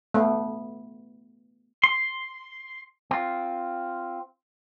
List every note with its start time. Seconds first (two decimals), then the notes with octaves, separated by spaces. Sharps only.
0.14 A3 B3
1.84 C6
3.11 C4 F4